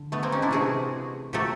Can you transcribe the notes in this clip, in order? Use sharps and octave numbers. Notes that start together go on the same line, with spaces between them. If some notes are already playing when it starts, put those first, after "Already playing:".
Already playing: D3
A3 B3
A#3 C4
C#4 D#4
D4 E4
C3 E3 A3 F#4 G#4
A#2 F#3 A3 G4 A4